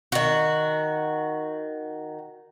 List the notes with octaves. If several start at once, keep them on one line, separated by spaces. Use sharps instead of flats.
D#3 F#4